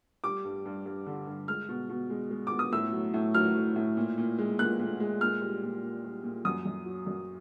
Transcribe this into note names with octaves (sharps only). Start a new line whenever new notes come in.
G3 D6
G2
G2
G2
D3
G2
G#3 F6
B2
B2
G#3
G#3
B2 D6
D#6
A2 E6
F#3
A2
F#3 F6
F#3
A2
A#2
A#2
G#3
A#2 F#6
A#2
G#3
A#2 F6
G3
A#2
A#2
G3
A#2
F#2 D#6
F#2
F#3
F#2